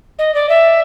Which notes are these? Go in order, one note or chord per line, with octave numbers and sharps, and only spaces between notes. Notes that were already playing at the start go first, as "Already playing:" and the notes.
D#5
D5
E5